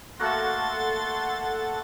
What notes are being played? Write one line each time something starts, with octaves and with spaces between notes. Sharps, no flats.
A3 A#3 F#4 A4 F#5 C6 A6